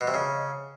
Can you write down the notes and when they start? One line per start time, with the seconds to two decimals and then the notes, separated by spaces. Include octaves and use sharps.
0.01 B2
0.07 C3
0.14 C#3